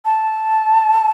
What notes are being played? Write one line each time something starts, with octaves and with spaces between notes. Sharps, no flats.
A5